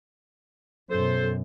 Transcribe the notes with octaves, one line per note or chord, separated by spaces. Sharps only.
F#2 B2 A4 C5